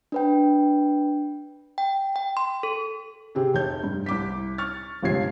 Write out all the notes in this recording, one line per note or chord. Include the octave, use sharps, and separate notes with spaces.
D4 B4 G5
G5
G5
C6
A4
C3 C4 G4 G#4
F1 C#5 G6
G2
C2 D6 B6
C#6 F6 A6
G1 C#2 C3 F3 G#6 C7